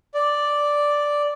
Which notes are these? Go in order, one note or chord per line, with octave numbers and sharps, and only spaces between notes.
D5